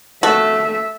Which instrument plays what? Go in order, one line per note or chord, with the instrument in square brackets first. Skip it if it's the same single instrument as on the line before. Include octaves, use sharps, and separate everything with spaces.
[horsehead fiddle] A3 E5 [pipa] F#4 A4